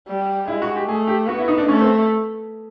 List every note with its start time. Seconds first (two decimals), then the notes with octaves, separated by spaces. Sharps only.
0.08 G3
0.48 G#3 E4
0.62 F#4
0.75 G4
0.88 A3 G#4
1.07 G4
1.27 B3 F#4
1.38 E4
1.48 D#4
1.58 D4
1.67 A3 C#4
1.82 C4